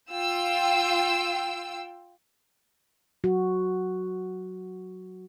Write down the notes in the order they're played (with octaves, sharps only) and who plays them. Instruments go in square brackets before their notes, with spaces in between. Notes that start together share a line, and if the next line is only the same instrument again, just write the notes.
[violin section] F4 G5 E6
[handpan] F#3 F#4